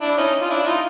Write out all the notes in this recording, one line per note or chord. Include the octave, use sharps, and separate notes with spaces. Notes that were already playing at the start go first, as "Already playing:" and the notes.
D4 E4
C#4 D#4
F4
D4 E4
D#4 F4